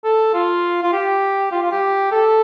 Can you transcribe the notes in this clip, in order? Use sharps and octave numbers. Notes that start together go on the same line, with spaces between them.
A4
F4
F4
G4
F4
F4
G4
A4